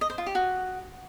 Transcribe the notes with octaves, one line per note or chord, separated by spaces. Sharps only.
D#5
C5
F4
G4
F#4